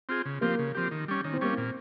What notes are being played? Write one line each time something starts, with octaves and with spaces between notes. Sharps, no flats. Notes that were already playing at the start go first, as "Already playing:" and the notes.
C4 F4 G#4
C#3
F3 A#3 C4 G4
C#3
F3 C4 G4
D#3
G3 C#4
D#3 C#4
C4
G3 A#3 C#4
C4
A#2